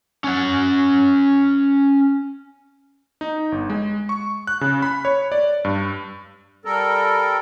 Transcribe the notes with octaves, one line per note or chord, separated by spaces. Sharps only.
C#4 F#5
D#4
G1
G#3
C#6
F#6
C#3
B5
C#5
D5
G2
G3 A4 A#4